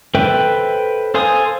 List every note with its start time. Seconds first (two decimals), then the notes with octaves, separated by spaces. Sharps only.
0.15 A4 B4 C5 E5 G5
1.14 A4 C5 F5 G#5 D#6